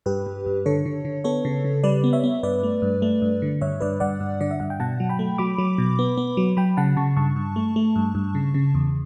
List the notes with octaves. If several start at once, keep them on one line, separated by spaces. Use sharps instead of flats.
G2 G4 B4
G2
G2
D3 A4 C#5
D3
D3
B3 A4 C#5
C#3
C#3
G3 B4 D5
B3
C#5 E5
B3
G2 B4 D5
A3
G2
A3
G2
D3
G2 C#5 E5
G2 B4 D5
G2 D5 F#5
G2
D3 D5
E5
G2 F#5
G5
B2 F#5 A5
F#3
G5 B5
A3
F#3 B5 D6
F#3
B2
B3
B3
F#3
F#3 G5 B5
C#3 F#5 A5
C#3 A5 C#6
G2 A5 C#6
G2
A3
A3
G2
G2
C#3
C#3
E2